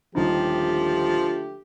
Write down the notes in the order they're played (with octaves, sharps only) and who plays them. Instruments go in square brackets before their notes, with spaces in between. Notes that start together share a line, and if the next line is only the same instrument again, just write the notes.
[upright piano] D#1 D#4 [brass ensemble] D3 A3 G4 [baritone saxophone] F3